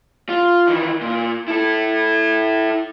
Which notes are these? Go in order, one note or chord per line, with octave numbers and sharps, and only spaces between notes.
F4
D#3 E3
A#2
E4 A4